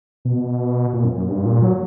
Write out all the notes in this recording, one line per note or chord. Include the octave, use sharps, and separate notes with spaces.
B2
A#2
F#2
F#2
G2
A#2
F#3